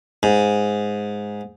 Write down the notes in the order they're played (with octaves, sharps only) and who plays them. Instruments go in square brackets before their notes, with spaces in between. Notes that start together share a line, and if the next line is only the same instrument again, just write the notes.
[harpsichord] G#2